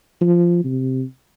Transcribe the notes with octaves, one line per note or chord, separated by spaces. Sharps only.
F3
C3